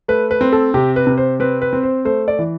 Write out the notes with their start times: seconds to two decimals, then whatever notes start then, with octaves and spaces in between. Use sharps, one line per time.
0.08 A3 B4
0.31 B4
0.41 C4
0.53 A4
0.74 C3 G4
0.96 B4
1.07 C3
1.18 C5
1.40 C4 B4
1.62 B4
1.73 C4
1.83 C5
2.05 A3 C5
2.28 D5
2.39 E3